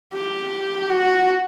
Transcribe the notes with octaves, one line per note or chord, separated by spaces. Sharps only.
G4
F#4